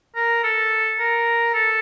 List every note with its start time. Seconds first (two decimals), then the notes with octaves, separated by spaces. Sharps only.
0.16 A#4
0.43 A4
0.99 A#4
1.54 A4